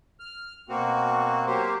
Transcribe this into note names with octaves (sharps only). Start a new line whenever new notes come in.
F6
B2 A#3 C4 F#4
F#3 A#3 G4 C5